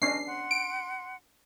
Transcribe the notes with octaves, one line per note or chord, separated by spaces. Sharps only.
B3 C#4 D4 D#5 F6 C7
F#5 C6
D7